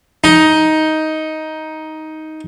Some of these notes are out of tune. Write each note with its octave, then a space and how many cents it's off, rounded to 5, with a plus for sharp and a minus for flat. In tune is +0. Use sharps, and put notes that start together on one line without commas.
D#4 +10